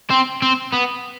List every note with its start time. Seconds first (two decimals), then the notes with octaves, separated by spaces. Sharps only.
0.10 C4
0.42 C4
0.74 B3